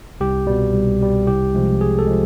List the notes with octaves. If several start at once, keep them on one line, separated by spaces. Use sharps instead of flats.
C2 G4
B2 G3
C2
B2 G3
C2 G4
C3 F3 G#3
C2 G#4
A4
F3 G#3